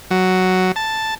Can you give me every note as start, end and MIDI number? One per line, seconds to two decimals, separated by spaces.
0.11 0.72 54
0.76 1.15 81